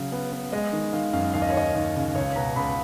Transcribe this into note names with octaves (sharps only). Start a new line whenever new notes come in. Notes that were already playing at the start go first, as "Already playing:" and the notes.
Already playing: C#3 F#3
B3
B3
G#3 D#5
D#3
D#3 F5
F#2 F5
D#2 F5
D#5
C#5
D#2 D#5
D#2
C#3
C#2 C#5
B2 A#5
C#2 B5